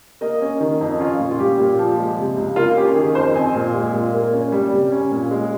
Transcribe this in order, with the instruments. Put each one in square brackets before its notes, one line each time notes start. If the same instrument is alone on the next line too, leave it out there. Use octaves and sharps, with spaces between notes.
[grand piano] A#3 D#5
C#4
D#3
F2
C#4 F4
A#2
F4
G3 G4
A#2
F3
G#3
C3
C#2
A#3 F4
C#4 G4
D#3 G#4
F2 C5
C4 G#5
A#2
G#3
A#2
A#3
C#4
G3
C3
C#4
A#2
G#3